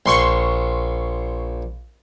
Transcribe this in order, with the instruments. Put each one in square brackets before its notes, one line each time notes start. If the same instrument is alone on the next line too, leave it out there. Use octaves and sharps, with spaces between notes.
[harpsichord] A#1 [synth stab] C6 C#6